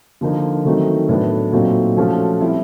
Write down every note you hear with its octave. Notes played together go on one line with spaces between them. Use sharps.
D3 F3 A#3 D#4
D#3 F#3 A3 C4 D#4
A2 F#3 B3 D4
A#2 F#3 A3 C4 D#4
F3 A3 C#4 F#4
G3 C4 E4